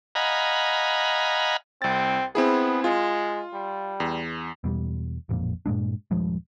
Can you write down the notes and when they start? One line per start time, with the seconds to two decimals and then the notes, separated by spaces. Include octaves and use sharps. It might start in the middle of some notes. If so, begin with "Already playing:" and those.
0.15 D#5 F5 F#5 G#5 A#5 B5
1.82 C2 C4 A6
2.35 B3 C4 E4 G#4
2.84 G#3 F4
3.53 G3
4.00 E2
4.64 E2 B2 G3
5.29 A1 F2 A#2
5.66 G2 A#2 G#3 D4
6.11 D#1 G2 F3 G#3